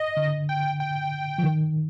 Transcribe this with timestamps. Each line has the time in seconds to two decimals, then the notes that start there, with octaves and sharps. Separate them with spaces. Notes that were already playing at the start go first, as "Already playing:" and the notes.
Already playing: D#5
0.17 D3
0.49 G5
0.80 G5
1.38 F3
1.44 D#3